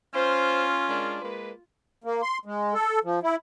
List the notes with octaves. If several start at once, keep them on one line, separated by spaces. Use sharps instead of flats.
C#4 F4 C5
G#3 D4 A#4
G#3 A#3 B4
A#3
C6
G#3
A4
F3
E4